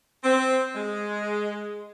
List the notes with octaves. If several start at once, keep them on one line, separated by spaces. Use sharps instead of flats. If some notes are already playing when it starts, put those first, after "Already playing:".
C4
G#3